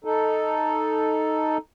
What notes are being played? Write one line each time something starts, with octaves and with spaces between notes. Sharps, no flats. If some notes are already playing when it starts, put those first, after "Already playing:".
D#4 A4